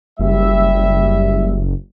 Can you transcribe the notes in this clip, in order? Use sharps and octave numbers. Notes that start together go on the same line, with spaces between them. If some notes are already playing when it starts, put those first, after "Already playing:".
F#1 G3 E5